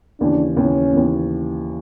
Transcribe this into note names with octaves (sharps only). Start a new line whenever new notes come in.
D#2 C#3 E3 D4
D#2 C#3 E3 C#4
D#2 C#3 E3